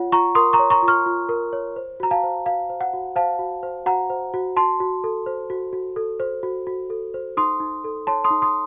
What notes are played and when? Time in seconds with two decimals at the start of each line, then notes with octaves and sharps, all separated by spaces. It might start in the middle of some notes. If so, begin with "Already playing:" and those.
Already playing: F4 C#5 F#5
0.12 F4 A#5 C#6
0.35 A#4 C6 D#6
0.53 A#5 C#6
0.59 C#5
0.70 A#5 C#6
0.83 F4
0.88 C#6 F6
1.06 F4
1.29 A#4
1.53 C#5
1.76 C5
2.00 F#4 A#5
2.11 F5 A5
2.23 C5
2.46 F#4 F5
2.70 C5
2.81 F#5
2.93 F#4
3.16 C5 F5 A5
3.39 F#4
3.63 C5
3.86 F#4 F#5 A#5
4.10 C5
4.34 F#4
4.57 F#4 A5 C6
4.80 F#4
5.04 A4
5.26 C5
5.50 F#4
5.73 F#4
5.96 A4
6.20 C5
6.43 F#4
6.67 F#4
6.90 A4
7.14 C5
7.37 D#4 C6 D#6
7.60 D#4
7.84 A4
8.07 C#5 A5 C6
8.24 C6 D#6
8.30 D#4
8.42 C6 D#6